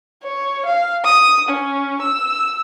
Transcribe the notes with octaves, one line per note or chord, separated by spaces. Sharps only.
C#5
F5
D#6
C#4
E6